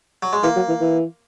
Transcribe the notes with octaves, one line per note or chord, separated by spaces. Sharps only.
F#3
G#3
E3 A#3
F#3
E3
E3